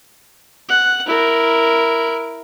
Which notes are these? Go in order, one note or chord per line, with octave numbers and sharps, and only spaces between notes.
F#5
E4 A#4